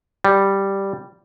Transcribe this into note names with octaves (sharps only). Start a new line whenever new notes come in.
G3